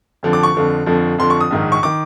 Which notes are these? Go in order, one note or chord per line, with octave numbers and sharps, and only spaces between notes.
F2 D3 F3
D6
C#6
F2 D3 F3
F2 D3 F3
F2 D3 F3 C6
C#6
D#6
A#1 G#2 D#3
C#6
D#3 D6